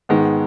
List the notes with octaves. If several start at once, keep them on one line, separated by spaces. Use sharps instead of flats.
G#2 D#3 G#3 B3